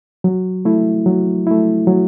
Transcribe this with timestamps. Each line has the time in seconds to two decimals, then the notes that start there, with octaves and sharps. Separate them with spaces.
0.24 F#3
0.65 A3 E4
1.06 F#3
1.47 A3 E4
1.87 F#3